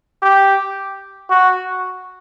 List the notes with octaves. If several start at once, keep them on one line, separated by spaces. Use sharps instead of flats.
G4
F#4